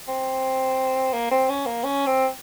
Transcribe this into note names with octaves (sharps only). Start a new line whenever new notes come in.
C4
A#3
C4
C#4
A#3
C#4
C4